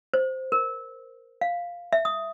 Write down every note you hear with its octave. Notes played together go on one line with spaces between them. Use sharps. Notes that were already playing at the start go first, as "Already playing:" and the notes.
C5
A#4
F5
E5
D#6